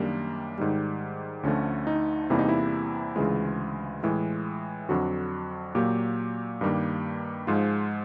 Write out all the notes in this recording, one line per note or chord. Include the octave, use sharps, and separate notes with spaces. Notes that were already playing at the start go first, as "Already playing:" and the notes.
Already playing: F#2 D#3 G3 A#3 D4
G#2 D#3 G3
D2 D3 F3 A3 C#4
D#4
E2 C3 E3 G3 A#3 E4
D#4
E4
D2 C#3 E3 G#3 F4
A2 E3 G#3
F2 D3 F#3 F#4
A#2 F#3 A#3 G4
G2 D#3 G3 A#3
G#2 F3 G#3 F4